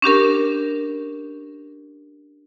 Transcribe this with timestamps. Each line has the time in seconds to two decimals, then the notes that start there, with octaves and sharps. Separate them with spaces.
0.02 C#4 D4 G4 A#4